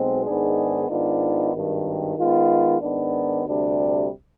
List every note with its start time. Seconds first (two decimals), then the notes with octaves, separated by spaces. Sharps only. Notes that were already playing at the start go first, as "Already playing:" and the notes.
Already playing: B1 B2 G#3 C4
0.25 G#2 D#3 B3 D4 G#4
0.90 G#2 D#3 B3 D4 F4
1.54 G#1 G2 D#3
2.18 D#3 G#3 B3 F4
2.81 G#2 D#3 B3 D4
3.45 D2 C3 G3 D4